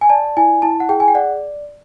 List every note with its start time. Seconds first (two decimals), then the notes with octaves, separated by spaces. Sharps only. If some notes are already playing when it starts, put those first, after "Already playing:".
0.01 G#5
0.09 D5 A5
0.37 E4 G#5
0.62 E4 A5
0.80 F#5
0.89 G#4 G5
1.00 G#5
1.08 G5
1.15 D5 F#5